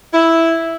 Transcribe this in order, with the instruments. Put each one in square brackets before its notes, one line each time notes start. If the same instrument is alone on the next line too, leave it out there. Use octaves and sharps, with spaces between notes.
[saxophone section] E4